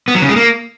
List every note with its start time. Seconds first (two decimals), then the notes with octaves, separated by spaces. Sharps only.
0.08 B3
0.15 F#3
0.22 C#3
0.29 G#3
0.36 A#3